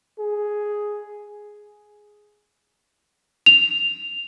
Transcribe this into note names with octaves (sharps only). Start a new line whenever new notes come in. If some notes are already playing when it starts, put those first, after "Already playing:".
G#4
F7